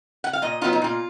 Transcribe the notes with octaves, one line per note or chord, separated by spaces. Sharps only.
F#5
F5
A#2 D#5
F#3 B3 D#4 F4
D#4
A#2 F4